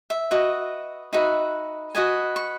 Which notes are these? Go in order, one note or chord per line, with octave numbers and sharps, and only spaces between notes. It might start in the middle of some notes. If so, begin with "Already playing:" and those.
E5
F#4 B4 D#5
D#4 F#4 B4 E5
F#4 B4 D#5 G#5
C#6